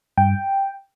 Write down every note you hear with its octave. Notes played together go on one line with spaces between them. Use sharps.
G2 G5